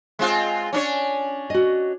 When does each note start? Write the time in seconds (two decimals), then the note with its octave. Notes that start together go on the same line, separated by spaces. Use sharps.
0.19 G#3 C4 F4
0.73 C#4 D4 C#5
1.50 F#4 D#5